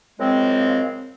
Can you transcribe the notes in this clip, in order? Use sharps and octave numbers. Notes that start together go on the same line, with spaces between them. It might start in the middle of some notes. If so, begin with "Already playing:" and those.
F#2 C#3 F3 G#3 C4